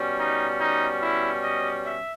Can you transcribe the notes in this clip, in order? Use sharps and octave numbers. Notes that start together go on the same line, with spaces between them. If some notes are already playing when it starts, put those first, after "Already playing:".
Already playing: B2 G3 C#4
D#4
D#4
E4
D#5
E5